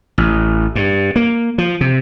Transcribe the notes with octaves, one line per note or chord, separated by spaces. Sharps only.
A1
G2
A#3
F3
C3